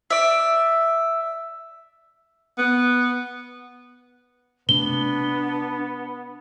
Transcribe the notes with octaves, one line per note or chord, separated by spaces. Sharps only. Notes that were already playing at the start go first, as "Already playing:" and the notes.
D5 E5
B3
C3 A3 B3 D4 G7